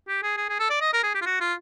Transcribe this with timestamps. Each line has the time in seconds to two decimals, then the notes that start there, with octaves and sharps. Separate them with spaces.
0.08 G4
0.23 G#4
0.37 G#4
0.49 G#4
0.59 A4
0.70 D5
0.81 D#5
0.93 A#4
1.03 G#4
1.15 G4
1.22 F4
1.26 F#4
1.40 F4